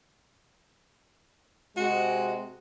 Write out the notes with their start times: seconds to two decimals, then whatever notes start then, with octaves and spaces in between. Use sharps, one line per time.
1.77 C3 G#3 F#4